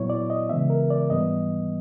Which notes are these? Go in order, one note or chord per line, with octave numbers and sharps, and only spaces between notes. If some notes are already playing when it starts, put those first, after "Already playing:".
Already playing: A#2 F#3 B3 E4 C#5
D5
D#5
C#3 E3 G#3 B3 E5
A#4
D5
G#2 E3 G3 B3 D#5